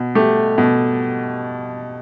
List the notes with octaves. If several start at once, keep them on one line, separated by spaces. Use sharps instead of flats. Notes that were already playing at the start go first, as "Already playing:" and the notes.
Already playing: B2
A3 G4
B2